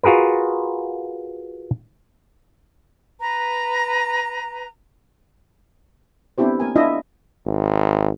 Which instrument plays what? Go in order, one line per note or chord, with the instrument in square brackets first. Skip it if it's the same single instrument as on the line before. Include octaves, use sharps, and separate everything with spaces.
[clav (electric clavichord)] F4 F#4 G#4 A#4 B4
[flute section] B4 A#5
[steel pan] B3 C4 D4 E4 G4 C5
A#3 A#4 G#5
D4 E4 F4 D#5 E5
[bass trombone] G#1